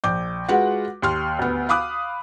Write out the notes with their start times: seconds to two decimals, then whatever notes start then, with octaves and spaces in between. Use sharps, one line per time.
0.04 A#1 D6 G6
0.48 G#3 F4 F#4 B4 F#5
1.02 D#2 C6 F6
1.39 D2 B3
1.69 F5 B5 D6 D#6 F#6